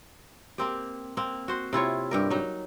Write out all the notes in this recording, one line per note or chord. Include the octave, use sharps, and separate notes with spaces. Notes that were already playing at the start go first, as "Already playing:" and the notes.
A#3 C4 G4
A#3 C4
F#4 C5
C3 E4 F4 C#5
G2 G4 A#4
F#3 D#4